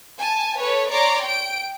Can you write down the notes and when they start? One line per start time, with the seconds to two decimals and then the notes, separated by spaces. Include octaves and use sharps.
0.20 G#5 A5
0.57 A4 B4 C#5
0.89 C#5 D5 A#5 C6 D6
1.23 G5 D7